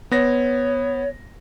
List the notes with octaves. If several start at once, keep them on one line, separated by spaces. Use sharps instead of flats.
B3 C#5 A#6